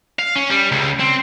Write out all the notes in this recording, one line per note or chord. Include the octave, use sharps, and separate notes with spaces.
F5
C#4
G3
C#2
C4